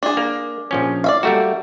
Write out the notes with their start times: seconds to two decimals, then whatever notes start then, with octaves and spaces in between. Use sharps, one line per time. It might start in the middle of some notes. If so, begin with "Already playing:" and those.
0.03 D4 G#4
0.17 A#3
0.71 A#1 F3 C#4
1.04 D5 E5 F5
1.23 G3 A3 A#3 F#4